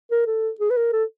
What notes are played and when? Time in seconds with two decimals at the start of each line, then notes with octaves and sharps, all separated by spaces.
0.11 A#4
0.27 A4
0.60 G#4
0.70 B4
0.77 A#4
0.93 A4